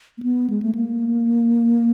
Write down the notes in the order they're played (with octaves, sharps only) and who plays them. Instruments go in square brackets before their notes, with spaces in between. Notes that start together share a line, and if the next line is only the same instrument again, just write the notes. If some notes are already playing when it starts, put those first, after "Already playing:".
[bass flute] A#3
B3
G#3
A3
A#3